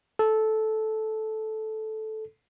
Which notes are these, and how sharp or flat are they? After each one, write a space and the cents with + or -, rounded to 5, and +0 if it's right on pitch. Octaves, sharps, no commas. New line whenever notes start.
A4 -10